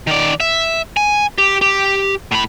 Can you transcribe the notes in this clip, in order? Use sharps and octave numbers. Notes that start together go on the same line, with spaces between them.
D#3 D5
E5
G#5
G4
G4
A2 B5